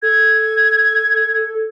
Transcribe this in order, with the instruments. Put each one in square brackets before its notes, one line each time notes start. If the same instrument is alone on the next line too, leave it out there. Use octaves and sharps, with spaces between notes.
[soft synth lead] A4 [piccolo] G#6